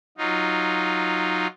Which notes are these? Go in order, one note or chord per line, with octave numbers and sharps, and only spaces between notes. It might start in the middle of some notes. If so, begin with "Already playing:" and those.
F#3 D#4 F4